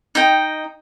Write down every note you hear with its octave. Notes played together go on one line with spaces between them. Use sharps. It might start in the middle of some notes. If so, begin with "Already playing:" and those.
D#4 D#5 G5